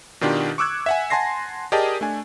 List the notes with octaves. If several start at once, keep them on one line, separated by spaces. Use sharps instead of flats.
B2 D#3 D4 F4 G4
C#6 D6 E6 F#6 G#6
E5 F#5 G#5
F#5 G#5 A5 C6 A#6 C7
G4 G#4 A#4 D5 D#5 A5
A3 D4 G#5